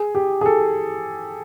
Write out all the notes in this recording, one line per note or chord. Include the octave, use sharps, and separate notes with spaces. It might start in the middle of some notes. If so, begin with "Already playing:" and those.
Already playing: G#4
G4
G#4
A4